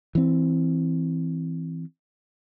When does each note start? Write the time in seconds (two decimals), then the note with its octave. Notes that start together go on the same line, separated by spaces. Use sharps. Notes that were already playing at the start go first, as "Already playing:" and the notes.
0.15 E3 C4